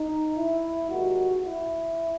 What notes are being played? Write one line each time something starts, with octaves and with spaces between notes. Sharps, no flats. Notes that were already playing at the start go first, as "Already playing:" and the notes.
Already playing: D#4
E4
D#2 D#3 G#3 F#4
E4